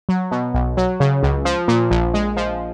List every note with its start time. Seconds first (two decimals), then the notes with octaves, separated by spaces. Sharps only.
0.09 F#3
0.31 B2
0.54 B1
0.77 F#3
1.00 C#3
1.23 C#2
1.45 F3
1.68 A#2
1.91 A#1
2.14 G#3
2.37 F3